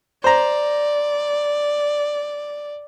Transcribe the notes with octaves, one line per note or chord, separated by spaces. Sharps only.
C5 D5 A#5